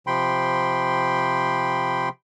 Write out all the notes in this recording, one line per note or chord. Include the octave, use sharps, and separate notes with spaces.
C3 F3 G5 B5 C6